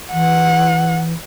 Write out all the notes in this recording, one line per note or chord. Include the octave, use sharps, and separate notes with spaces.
E3 F#5